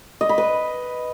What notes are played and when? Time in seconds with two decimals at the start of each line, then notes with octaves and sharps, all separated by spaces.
0.21 D#5
0.29 B5
0.38 B4